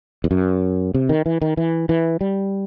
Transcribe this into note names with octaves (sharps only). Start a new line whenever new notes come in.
E2
F#2
C3
D#3
E3
D#3
E3
E3
G3